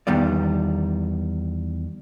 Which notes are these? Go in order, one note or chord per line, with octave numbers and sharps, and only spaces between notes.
E2 D#3 G3 B3 D5